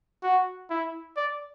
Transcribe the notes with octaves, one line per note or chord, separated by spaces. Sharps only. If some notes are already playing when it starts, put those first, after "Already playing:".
F#4
E4
D5